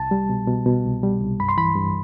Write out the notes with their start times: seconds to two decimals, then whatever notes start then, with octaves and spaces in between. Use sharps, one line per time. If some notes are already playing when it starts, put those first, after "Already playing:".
Already playing: C2 A5
0.11 G3
0.29 B2
0.47 B2
0.66 B2
0.85 C2
1.03 G3
1.21 C2
1.40 G2 B5
1.49 C6
1.57 E3 B5
1.76 G2